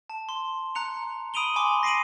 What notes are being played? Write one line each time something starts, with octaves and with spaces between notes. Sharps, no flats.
A5
C6
A#5 F#6 C#7 F7
B5 D#6 D7 D#7 F7 G7
G#5 B5 C6 D6
A#6 C7 D7 D#7 F#7